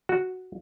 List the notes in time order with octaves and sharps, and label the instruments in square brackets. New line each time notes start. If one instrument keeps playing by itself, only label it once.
[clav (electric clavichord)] F#4